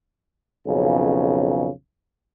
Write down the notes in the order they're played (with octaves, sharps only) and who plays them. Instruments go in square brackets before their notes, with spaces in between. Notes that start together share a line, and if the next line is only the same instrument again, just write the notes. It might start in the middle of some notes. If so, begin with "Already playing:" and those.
[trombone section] B1 F2 C#3